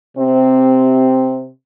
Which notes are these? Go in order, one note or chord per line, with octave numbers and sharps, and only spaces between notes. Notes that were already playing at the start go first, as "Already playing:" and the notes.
C3 C4